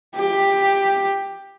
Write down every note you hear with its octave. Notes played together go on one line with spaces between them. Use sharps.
G4